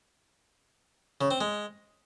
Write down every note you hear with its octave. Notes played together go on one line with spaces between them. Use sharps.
C#3
C4
G#3